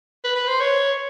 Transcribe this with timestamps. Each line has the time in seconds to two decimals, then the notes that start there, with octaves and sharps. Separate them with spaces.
0.24 B4
0.36 B4
0.48 C5
0.60 C#5